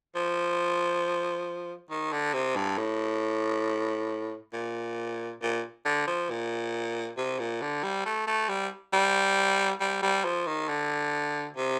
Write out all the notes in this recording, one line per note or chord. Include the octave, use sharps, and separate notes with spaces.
F3
D#3
D3
C3
G2
A2
A#2
A#2
D3
F3
A#2
C3
A#2
D3
G3
A3
A3
G3
G3
G3
G3
F3
D#3
D3
C3